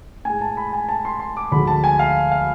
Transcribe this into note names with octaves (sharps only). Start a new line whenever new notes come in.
A2 G#3 G#5
A5
B5
G#5
A5
C6
C6
D6
D2 D3 F3 G#3 B5
A5
G#5
F5
F5